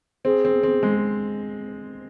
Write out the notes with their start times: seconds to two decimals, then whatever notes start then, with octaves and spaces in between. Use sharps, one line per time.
0.25 C4 G#4
0.45 C4
0.63 C4
0.83 G#3